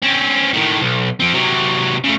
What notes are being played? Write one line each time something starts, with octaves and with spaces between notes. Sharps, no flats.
C4 C#4
A2 D#3
B1
F3 C4
C3 F#3
C#3 A3